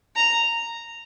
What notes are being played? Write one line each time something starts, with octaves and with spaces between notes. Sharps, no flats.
A#5